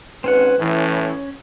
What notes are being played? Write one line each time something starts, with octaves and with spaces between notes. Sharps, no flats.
G#1 C4 C#4 B4 F#5
A2 E3 C#4 E4